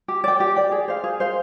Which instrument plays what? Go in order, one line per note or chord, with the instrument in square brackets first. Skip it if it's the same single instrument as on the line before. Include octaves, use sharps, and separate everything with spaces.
[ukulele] G4
D5 G5
G4
D5 G5
G#4
C5 F5
G#4
C5 F5